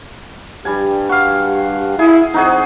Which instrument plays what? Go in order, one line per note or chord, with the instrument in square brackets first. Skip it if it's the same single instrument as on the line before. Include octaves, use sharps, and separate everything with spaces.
[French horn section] G2 G4 [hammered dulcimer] G3 G#5
[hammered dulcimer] F#4 F5
[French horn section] E4 [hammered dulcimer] G#4
[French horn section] F2 C5 [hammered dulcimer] D#4 F#4 G#4